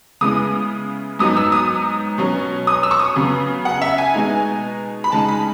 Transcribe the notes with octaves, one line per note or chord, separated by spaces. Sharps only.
C#3 G#3 B3 E4 D#6
G#2 F#3 B3 D#4 D#6
E6
D#6
B2 F#3 C#4
D#6
E6
C#6
D#6
C#3 F#3 B3
F#5
E5
G#5
B2 G#3 D#4
B5
C#3 G#3 D#4 A5
B5